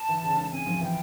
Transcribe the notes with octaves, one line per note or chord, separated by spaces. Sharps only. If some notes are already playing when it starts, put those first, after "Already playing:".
Already playing: A5
E3
C#3
G#3
C4 G#5
F3
E3 G5